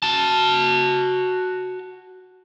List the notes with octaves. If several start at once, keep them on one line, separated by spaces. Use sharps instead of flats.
F#4 A5